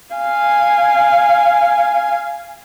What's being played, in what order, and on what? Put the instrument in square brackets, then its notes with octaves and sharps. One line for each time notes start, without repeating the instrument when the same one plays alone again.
[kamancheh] F5 G#5